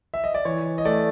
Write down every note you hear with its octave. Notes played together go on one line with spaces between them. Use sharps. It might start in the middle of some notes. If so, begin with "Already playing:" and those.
E5
D#5
D5
E3 C#5
D#5
A3 D5